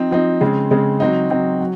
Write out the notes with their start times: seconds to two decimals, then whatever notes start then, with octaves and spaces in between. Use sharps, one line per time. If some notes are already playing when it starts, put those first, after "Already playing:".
Already playing: F3 C4 D#4
0.11 F3 C4 D#4
0.41 C#3 G#3 C4
0.71 C#3 G#3 C4
1.00 F#3 C4 D#4
1.30 F#3 C4 D#4
1.60 F#3